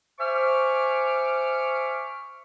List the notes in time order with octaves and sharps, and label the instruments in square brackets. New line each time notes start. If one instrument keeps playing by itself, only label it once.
[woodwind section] C5 E5 G#5 C#6 D6 F6